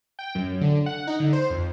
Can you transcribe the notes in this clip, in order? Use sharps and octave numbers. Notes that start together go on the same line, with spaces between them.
G5
F#2
D3
F#5
D#4
D3
C5
F2